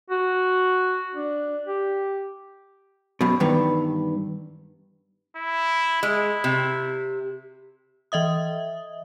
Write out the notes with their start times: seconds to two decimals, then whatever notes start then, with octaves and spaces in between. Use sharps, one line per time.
0.10 F#4
1.15 D4
1.66 G4
3.21 F#2 B2
3.40 G2 D#3 E3 B3
5.37 E4
6.03 G#3 E4
6.44 C3
8.12 E3 D#5 E5 D#6